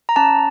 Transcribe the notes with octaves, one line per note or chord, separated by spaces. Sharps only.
A#5
C#4 A5